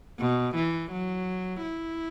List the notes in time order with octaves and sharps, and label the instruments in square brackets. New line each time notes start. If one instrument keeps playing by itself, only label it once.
[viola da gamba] B2
E3
F#3
E4